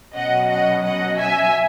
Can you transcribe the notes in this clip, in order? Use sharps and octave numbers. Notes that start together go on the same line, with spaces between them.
B2 F#3 C#4 D#5 F#5
D#5 F#5
D#5 F#5
E5 G#5